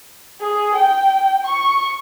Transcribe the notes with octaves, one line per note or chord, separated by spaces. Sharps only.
G#4
G5
C#6